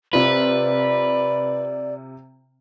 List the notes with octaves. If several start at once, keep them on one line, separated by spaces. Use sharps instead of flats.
C3 F4 B4 D5